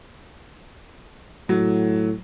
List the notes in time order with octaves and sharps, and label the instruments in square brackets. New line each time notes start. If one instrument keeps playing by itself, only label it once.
[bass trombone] A2 [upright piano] F#3